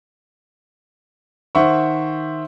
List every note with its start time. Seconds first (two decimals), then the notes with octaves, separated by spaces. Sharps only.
1.55 D#3 C5 E5 F#5 C#6